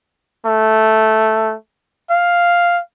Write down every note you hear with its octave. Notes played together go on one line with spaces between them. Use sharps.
A3
F5